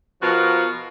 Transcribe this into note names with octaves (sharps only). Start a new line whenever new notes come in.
B2 F3 F4 F#4 A#4